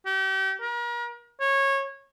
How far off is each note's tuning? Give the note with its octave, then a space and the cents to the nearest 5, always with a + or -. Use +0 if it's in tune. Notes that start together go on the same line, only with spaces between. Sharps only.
G4 -35
A#4 +40
C#5 -20